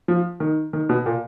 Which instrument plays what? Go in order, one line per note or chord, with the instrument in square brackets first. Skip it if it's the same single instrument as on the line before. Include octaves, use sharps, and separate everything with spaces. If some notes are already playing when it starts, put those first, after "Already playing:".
[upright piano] F3
D#3
D#3
B2
A#2